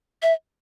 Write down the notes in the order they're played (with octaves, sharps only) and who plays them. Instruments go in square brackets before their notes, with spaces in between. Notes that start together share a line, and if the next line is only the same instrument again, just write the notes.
[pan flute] E5